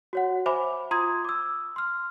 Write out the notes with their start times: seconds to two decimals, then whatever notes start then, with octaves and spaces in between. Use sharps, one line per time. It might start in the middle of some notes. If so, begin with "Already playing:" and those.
0.13 F#4 C#5 F#5
0.46 C5 E5 G#5 B5 D6
0.91 F4 A#5 C6 D#6 G#6
1.25 D6 E6
1.76 C6 F6